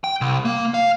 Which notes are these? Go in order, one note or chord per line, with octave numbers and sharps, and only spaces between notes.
G5
C2
A#3
F5